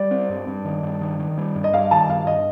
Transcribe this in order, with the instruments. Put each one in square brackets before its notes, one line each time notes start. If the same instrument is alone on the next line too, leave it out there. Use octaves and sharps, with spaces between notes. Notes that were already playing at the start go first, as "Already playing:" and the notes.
Already playing: [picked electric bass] G3 [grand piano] D5
[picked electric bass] C4
G2
G2
D#3
G2
D#3
D#3
G3
G2
[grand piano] D#5
[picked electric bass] G3 [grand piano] F5
[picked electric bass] D#3 [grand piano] A5
[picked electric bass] G2 [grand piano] F5
[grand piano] D#5